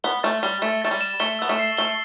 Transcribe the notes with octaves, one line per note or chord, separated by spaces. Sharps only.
B3 G7
A3 A6
G3 G7
A3 A6
A3 A6
G3
E7
A3 G7
B3 E6
A3
C7
A3 G7